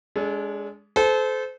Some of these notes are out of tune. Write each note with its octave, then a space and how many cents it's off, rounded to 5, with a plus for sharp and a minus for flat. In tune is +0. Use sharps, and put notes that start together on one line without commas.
G#3 -5 D4 -35 A4 -30
A4 -30 C5 -25